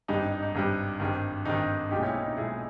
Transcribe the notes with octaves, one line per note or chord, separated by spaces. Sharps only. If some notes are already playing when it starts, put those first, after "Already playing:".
G#1 G2 G3 D#4
D#4
D#4
D#4
G#1 G2 G3
G#1 G2 D#3
G#1 G2 D#3 D#4
B1 A#2 G#3 D#4 G4
C#4 E4
D#4
D#4
B1 A#2 G#3 E4 G#4